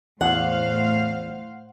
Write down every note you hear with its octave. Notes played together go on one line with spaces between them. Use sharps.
E2 A2 C5 F5 F#5